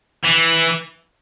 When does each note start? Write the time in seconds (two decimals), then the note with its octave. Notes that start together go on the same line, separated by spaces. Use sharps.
0.24 E3